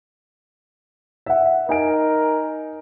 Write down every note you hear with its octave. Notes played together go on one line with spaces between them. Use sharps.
E5 F#5
D#4 A#4 G#5 D7